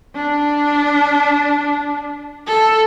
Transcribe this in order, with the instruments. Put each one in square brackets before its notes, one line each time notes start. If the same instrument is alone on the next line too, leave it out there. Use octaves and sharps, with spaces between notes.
[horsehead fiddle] D4
A4